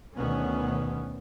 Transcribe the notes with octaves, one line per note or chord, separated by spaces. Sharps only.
D2 B2 D#3 B3 C#4